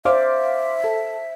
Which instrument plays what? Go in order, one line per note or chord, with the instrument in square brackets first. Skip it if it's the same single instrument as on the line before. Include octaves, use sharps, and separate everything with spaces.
[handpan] C5 D5 [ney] E5 [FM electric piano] F5 C6 D6
[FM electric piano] A4